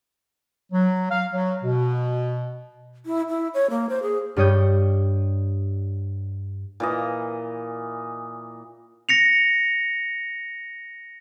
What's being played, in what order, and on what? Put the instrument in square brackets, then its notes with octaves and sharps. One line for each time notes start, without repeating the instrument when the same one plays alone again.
[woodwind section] F#3
F5
F#3
B2
[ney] E4
E4
C#5
A#3
C5
G#4
[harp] G2 G3 C#5 D#6 G6
[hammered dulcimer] A#2 E3 D#5
[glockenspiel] A#6 C#7 F7